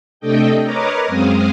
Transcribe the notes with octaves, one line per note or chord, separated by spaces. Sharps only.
C3 A3 D4 A4 D#5 G5
A#4 B4 C#5 D#5 A#5 D6
F#2 G#3 C4 F5 D#6